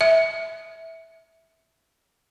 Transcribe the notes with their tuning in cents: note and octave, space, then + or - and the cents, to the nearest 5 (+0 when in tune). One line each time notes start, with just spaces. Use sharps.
E5 -10